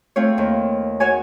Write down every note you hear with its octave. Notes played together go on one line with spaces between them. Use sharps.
A3 C4 F4 C#5
D#2
F#4 C#5 G#5